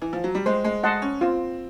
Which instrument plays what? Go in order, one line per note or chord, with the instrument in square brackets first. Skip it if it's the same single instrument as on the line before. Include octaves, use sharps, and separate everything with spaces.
[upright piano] E3
F3
F#3
G3
[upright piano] G#3 [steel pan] C5
[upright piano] G#3
[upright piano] G#3 [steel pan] D#5 F#5 A5 C6
[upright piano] C#4
[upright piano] C4 [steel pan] F4